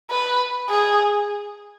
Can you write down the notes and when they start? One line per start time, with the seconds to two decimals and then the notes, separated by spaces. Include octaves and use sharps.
0.10 B4
0.70 G#4